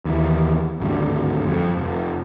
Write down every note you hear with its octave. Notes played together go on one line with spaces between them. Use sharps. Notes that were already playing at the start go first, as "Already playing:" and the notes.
D#2 E3
G#1 D2 G2
F2
F1